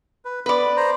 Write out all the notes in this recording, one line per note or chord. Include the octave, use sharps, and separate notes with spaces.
B4
B3 B4 D5
C5 A#5